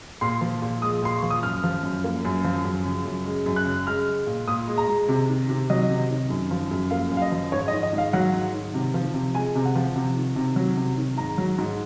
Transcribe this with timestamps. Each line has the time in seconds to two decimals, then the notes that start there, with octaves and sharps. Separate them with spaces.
0.21 A#2 C6
0.41 F3
0.62 A#2
0.82 G#3 D#6
1.03 A#2 C6
1.18 F3 C#6
1.30 D#6
1.43 F#2 F6
1.64 F3
1.83 F#2
2.04 A#3
2.25 F#2
2.44 F3
2.65 F#2
2.85 C#3
3.05 F#2
3.26 G#3
3.46 F#2
3.56 F#6
3.66 C#3
3.87 G#3 F6
4.06 G#3
4.27 A#2
4.47 A#2 D#6
4.68 G#3
4.78 A#5
4.88 G#3
5.08 C3
5.29 D#3
5.49 C3
5.70 F#3 D#5
5.90 C3
6.10 D#3
6.30 F#2
6.51 F3
6.71 F#2
6.91 A#3 F5
7.11 F#2
7.17 F5
7.22 D#5
7.32 F3
7.52 G#2 C#5
7.68 D#5
7.73 D#3
7.83 D#5
7.93 G#2
7.98 F5
8.13 F#3 F#5
8.33 G#2
8.54 D#3
8.74 C3
8.94 F3
9.14 C3
9.35 G#3 G#5
9.55 C3
9.65 F#5
9.75 F3
9.96 C3
10.17 D#3
10.36 C3
10.56 F#3
10.77 C3
10.97 D#3
11.17 G#2 A#5
11.38 F#3
11.58 G#2